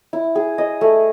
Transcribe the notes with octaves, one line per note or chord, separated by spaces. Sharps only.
E4
G#4
D#5
A3